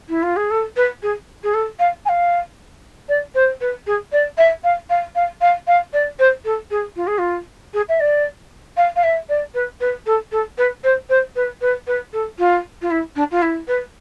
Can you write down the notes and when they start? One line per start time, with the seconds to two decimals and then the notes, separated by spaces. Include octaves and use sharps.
0.08 E4
0.22 F4
0.36 G#4
0.50 A4
0.76 B4
1.02 G#4
1.43 G#4
1.53 A4
1.79 F5
2.05 G#5
2.08 F5
3.08 D5
3.34 C5
3.60 B4
3.86 G#4
4.12 D5
4.37 E5
4.63 F5
4.89 F5
5.15 F5
5.41 F5
5.67 F5
5.93 D5
6.19 C5
6.44 A4
6.70 G#4
6.96 F4
7.07 G#4
7.18 F4
7.73 G#4
7.88 E5
7.99 D5
8.76 F5
8.95 F5
9.03 E5
9.29 D5
9.54 B4
9.80 B4
10.06 A4
10.31 A4
10.57 B4
10.83 C5
11.09 C5
11.35 B4
11.61 B4
11.87 B4
12.12 A4
12.38 F4
12.81 F4
12.90 E4
13.15 D4
13.31 F4
13.42 E4
13.67 B4